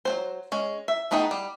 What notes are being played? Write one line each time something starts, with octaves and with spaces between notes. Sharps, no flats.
F#3 C4 C5
G#3 C#4
E5
A3 B3 D#4 G#4 G5
G3